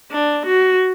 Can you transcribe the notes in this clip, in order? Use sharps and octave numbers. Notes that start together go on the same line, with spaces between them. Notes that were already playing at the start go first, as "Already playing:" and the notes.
D4
F#4